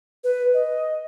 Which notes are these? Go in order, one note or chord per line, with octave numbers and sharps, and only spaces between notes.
B4
D#5